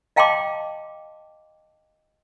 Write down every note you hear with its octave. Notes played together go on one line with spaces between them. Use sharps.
D#5 F5 G5 A5 C6 D6